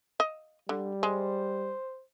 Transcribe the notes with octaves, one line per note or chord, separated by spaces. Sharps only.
D#5
D3 G3
G#3 C5